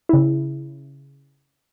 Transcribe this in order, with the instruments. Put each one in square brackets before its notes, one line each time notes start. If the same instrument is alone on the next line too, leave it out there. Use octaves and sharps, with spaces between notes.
[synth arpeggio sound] C#3 E4